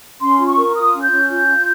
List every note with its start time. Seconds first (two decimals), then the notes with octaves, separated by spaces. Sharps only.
0.21 C#4 C6
0.39 F4
0.47 C#6
0.57 A#4
0.75 F4 D#6
0.93 C#4
1.02 G6
1.11 C#4
1.29 F4
1.47 F4